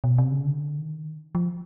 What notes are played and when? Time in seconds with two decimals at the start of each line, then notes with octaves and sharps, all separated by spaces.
0.04 B2
0.18 C3
0.32 C#3
0.45 D3
0.78 D#3
1.35 F3